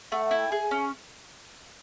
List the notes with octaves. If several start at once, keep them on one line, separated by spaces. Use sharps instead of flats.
A3 F#5
F#5
E4
G5
G#4 G#5
C#4